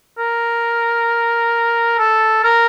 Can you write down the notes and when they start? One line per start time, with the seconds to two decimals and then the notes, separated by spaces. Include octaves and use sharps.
0.18 A#4
1.98 A4
2.43 A#4